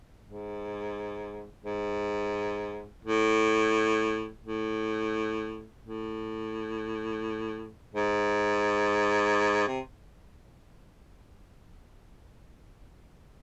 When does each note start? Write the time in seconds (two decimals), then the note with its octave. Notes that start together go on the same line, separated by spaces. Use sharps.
0.24 G#2
1.64 G#2
3.04 A2
4.44 A2
5.84 A2
7.94 G#2
9.68 C3